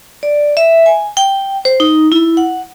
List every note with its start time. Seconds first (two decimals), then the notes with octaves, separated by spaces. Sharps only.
0.23 D5
0.57 E5
0.86 G#5
1.17 G5
1.65 C5
1.80 D#4
2.12 E4
2.37 F#5